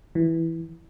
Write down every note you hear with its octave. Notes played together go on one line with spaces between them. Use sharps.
E3